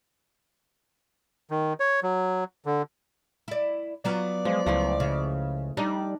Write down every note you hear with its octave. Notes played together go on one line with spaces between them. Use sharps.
D#3
C#5
F#3
D3
E4 D5
F#3 B3 F4 D5
F3 G#3
C#2 F3 A3 E4
C#3
G3 D4 D#4 D5